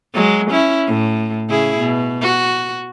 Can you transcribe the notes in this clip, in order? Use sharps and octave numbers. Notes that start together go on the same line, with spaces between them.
F#3 G#3
C#4 E4
A2
C#3 E4 G#4
B2
F#4